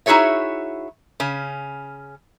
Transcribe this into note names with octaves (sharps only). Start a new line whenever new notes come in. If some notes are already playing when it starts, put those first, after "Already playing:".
D#4 E4 F#4 G#4 C#5 E5
C#3 C#4